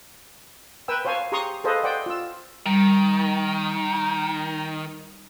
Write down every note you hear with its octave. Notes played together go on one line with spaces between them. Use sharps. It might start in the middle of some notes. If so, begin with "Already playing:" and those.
A#4 B4 G5 G#5 E6
C5 C#5 F5 G#5 A5 C#6
G4 G#4 A#5 C6 C#6 D#6
G#4 A4 B4 C5 D#5 F5
C5 D5 F#5 G5
F4 E6
D#3 G3